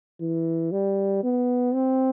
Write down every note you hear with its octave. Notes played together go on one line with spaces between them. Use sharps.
E3
G3
B3
C4